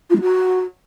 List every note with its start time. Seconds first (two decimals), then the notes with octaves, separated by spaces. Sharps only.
0.09 F4
0.15 G#3
0.21 F#4